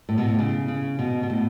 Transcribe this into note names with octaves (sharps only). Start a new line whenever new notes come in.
A2
B2
A2
C#3
C#3
B2
B2
A2